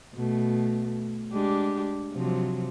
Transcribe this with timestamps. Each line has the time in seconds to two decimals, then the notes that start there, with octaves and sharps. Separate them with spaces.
0.14 B2 A3
1.32 G#3 D4 G4
2.13 C3 F3 F#3